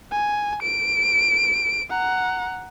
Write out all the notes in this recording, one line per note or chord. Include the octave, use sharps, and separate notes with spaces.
G#5
D7
F#5 A#5